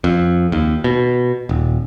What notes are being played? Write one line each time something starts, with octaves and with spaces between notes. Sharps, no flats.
F2
D#2
B2
D#1